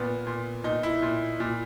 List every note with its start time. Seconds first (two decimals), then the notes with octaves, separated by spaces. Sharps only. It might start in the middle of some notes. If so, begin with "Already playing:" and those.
Already playing: A#2 B3
0.27 A#2
0.64 A#2 D#4
0.83 E4
1.02 A#2
1.40 A#2